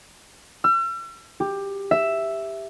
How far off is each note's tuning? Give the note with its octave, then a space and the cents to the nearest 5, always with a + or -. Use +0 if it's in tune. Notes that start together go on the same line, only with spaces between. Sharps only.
E6 +45
G4 +15
E5 +5